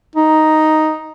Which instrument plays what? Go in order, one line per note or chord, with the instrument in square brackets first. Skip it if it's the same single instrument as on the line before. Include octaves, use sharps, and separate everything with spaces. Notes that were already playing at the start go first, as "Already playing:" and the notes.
[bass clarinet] D#4